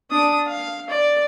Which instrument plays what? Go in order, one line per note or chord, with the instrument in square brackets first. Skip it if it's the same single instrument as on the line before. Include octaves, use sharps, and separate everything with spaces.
[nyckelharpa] D4 D#6
F5
D5